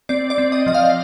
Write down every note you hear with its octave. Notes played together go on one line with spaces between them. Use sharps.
C4 D5
D5
C4
D#5
F3 D#5
F5